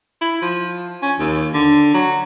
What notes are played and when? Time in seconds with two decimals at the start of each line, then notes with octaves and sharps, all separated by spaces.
0.21 E4
0.42 F3
1.02 C#4
1.19 D#2
1.54 D3
1.94 F#3